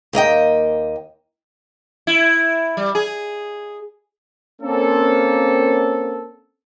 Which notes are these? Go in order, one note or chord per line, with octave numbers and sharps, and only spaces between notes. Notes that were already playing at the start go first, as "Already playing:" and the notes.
D#2 A#3 D#5 G5
E4
G3
G#4
A#3 C4 C#4 A4